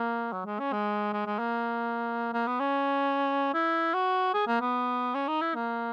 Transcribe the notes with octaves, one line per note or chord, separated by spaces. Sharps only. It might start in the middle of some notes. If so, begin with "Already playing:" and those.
Already playing: A#3
F#3
G#3
C#4
G#3
G#3
G#3
A#3
A#3
B3
C#4
E4
F#4
G#4
A#3
B3
C#4
D#4
E4
A#3